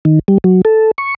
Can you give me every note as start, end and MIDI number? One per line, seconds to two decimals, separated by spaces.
0.05 0.19 51
0.28 0.38 55
0.44 0.62 54
0.65 0.91 69
0.98 1.14 85